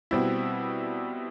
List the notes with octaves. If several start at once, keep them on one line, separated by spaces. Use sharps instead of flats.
B2 G3 C4 E4